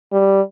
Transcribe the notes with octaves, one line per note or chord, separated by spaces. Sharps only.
G3